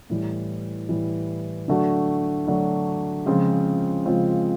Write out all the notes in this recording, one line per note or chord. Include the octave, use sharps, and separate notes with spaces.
A2 E3 G3
A2 E3 G3
D3 F#3 A3 D4 F#4
D3 F#3 A3 D4 F#4
C#3 F3 G#3 C4 F4
C#3 F3 G#3 C4 F4